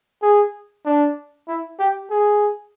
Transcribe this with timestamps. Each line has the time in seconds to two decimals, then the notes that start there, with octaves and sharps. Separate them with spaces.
0.22 G#4
0.86 D4
1.48 E4
1.79 G4
2.11 G#4